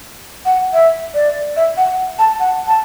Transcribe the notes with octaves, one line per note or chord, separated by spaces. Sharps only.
F#5
E5
D5
E5
F#5
A5
F#5
A5